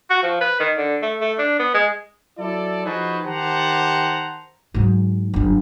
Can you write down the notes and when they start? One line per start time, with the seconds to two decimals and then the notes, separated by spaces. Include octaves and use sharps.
0.10 F#4
0.23 F3
0.41 B4
0.60 D#3
0.77 D3
1.02 A3
1.21 A3
1.39 D4
1.59 B3
1.74 G#3
2.38 F#3 E4 A4 D5
2.85 F3 D#4 F#4 G#4 B4 C5
3.25 D#3 G4 C5 F#5 A5 A#5
4.74 G#2 F#3
5.34 G1 F#2